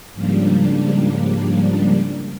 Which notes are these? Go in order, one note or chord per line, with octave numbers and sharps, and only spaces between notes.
G#2 C#3 F3 G3 A#3 D4